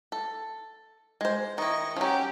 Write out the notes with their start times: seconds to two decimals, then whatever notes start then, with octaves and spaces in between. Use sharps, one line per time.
0.12 A4
1.21 G#3 C5
1.58 D#3 E4 D#5 C#6
1.96 F3 F#3 C#4 G4